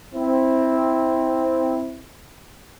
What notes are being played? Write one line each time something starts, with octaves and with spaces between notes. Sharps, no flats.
C4 E4